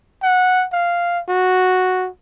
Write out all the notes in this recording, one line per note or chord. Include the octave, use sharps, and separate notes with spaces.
F#5
F5
F#4